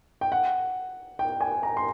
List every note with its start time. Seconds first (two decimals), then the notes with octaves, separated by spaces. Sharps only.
0.21 G5
0.32 F#5
1.19 G5
1.41 G#5
1.63 A#5
1.77 C6